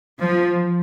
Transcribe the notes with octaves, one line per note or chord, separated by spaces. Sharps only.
F3